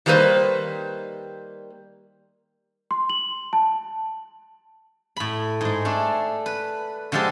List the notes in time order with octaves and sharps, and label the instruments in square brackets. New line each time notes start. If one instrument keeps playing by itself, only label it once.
[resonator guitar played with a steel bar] D#3 F#3 G3 A#3 B4 C5
[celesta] C6
F#7
A5
[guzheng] A2 B5
G#2 G#3
A3 D4
B4
D3 F3 G#3 G4 A4